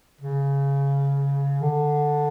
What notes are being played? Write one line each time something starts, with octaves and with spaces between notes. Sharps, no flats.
C#3
D3